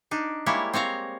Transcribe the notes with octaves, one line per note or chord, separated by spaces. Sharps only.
D4 D#4
G3 G#3 A#3 E4 C#5
C4 C#5 F5 A#5